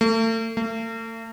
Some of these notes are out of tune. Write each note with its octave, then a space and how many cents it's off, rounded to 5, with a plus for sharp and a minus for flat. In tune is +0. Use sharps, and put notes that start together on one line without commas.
A3 +40
A3 +45